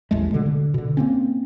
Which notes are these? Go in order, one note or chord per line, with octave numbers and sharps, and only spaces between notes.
A1 D#2 G#3 A3
B2 D3 G#3
D3
B2 D3
A#3 C4 C#4